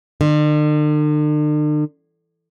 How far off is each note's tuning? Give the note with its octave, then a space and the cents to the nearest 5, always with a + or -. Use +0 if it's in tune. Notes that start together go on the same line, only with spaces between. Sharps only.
D3 +45